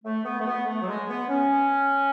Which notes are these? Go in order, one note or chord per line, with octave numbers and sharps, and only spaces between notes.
A3
B3
A3
B3
A3
F#3
G#3
B3
C#4